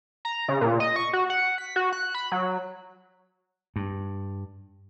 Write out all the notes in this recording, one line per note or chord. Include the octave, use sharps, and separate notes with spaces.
A#5
C#3
A#2
D#5
C#6
F#4
F#5
B6
F#4
F#6
B5
F#3
G2